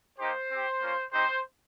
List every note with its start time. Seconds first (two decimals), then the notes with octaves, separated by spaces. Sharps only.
0.18 A#3 D#4 G4 C5
0.50 C4 G4
0.82 A#3 C#4 F4
1.13 C4 D#4 G4 C5